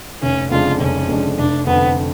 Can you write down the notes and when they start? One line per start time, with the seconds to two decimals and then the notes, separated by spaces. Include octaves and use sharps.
0.22 F1 C#4
0.51 F2 C#3 G#3 D4 F4
0.80 F1 C#4
1.09 F2 C#3 G#3 D4
1.38 F1 D4
1.67 F2 D3 B3